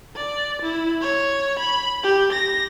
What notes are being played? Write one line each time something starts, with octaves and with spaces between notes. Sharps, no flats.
D5
E4
C#5
B5
G4
A#6